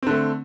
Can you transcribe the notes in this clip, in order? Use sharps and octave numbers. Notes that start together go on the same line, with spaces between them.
D3 A3 C4